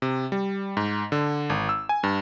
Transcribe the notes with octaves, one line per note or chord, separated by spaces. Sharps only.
C3
G3
G#2
D3
G#1
E6
G#5
G2